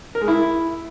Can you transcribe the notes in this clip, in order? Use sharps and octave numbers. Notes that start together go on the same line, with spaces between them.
A#4
G#3
E4